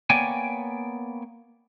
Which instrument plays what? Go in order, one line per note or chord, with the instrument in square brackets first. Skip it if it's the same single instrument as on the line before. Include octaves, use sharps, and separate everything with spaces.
[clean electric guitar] A#3 B3 C#5 D5 G5 G#5